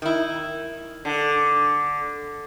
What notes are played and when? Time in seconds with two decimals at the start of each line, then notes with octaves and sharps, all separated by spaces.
0.02 D#3 E4
1.05 D3